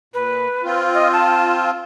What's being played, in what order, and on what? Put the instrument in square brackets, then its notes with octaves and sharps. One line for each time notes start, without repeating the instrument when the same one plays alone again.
[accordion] A#2 [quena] B4
[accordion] C4 F4
[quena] D#5
A5